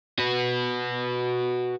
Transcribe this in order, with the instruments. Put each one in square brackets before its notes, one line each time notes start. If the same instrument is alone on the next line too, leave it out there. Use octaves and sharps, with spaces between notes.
[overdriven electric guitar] F#4 B4